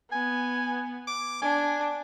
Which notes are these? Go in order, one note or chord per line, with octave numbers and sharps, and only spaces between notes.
B3 G#5
D6
D4 G#5